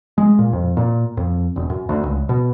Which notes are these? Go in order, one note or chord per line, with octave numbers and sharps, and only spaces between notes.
G#3
A#2
F2
A#2
F2
E1
F#2
D2
C#2
B2